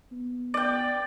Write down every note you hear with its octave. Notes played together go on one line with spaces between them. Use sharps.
B3
D5 G5